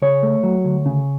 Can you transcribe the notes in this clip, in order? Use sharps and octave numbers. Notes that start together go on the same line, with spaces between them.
C#3 C#5
A3
F#3
D2
C#3